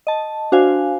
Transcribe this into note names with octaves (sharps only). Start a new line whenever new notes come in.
D#5 A5
D4 F#4 C5 F5 G#5